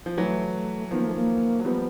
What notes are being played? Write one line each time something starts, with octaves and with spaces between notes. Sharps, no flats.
F3
E3 F#3 A3
D#3 F3 B3
A#3
A3
A#3
F#3
F3 G3 B3